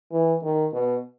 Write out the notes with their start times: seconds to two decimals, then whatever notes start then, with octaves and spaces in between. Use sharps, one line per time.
0.12 E3
0.43 D#3
0.73 B2